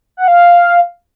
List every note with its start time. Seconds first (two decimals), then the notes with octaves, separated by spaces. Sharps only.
0.17 F#5
0.28 F5